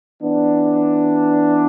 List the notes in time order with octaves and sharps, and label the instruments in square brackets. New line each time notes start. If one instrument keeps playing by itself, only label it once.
[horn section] E3 B3 D4